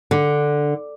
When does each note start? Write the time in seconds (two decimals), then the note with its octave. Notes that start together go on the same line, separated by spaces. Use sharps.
0.11 D3